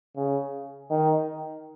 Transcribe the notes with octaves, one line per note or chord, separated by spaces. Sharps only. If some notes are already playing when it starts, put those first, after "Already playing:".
C#3
D#3